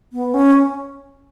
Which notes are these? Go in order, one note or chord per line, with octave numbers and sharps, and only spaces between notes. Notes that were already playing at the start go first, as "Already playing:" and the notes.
B3
C#4